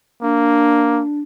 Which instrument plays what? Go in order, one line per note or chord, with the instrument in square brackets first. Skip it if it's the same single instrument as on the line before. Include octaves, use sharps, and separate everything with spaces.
[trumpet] A#3 [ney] D4